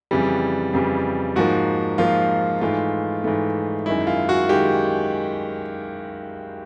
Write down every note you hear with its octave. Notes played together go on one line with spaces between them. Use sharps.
F2 C#3 E3 G3
F2 C#3 E3 G3
G#2 F3 A#3 F#4
G#2 F3 A#3 F4
G#2 E3 A3 F4
G#2 E3 A3
F#2 D#3 G#3 E4
F4
F#4
D#3 G#3 G4